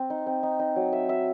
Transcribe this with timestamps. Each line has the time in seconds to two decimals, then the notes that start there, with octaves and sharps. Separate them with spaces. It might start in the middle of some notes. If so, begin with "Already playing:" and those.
Already playing: C4
0.10 D#4
0.26 C4
0.43 D#4
0.59 D#4
0.76 F#3
0.93 E5
1.09 E5